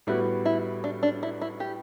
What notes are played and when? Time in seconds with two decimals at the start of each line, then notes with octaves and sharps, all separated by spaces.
0.07 A2 G3 B3 E4 F#4 B4
0.45 E4
0.84 D4
1.03 D4
1.23 E4
1.42 E4
1.60 G4